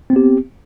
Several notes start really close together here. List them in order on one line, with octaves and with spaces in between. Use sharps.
C4 B3 G4